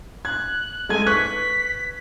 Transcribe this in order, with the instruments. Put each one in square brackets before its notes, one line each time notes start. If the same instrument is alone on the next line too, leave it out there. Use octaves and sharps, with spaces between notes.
[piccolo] F#6 [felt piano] G#6
[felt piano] G#3 A4 G#6 [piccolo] G#5
[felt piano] B4 C#6 F#6 [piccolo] B6